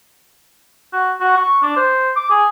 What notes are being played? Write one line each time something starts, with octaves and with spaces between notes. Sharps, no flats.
F#4
F#4
C#6
D4
C5
D6
G#4